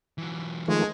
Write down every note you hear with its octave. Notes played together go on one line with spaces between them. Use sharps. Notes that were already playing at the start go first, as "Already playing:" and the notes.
E3 F#3
D#3 F3 G#3 A3